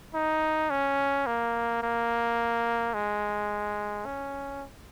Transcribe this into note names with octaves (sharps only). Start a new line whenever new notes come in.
D#4
C#4
A#3
A#3
G#3
C#4